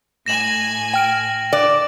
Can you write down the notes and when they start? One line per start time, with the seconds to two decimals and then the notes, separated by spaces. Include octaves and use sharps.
0.26 A2 G#5 A#6 E7 F#7
0.94 G5 F6 D7
1.53 D5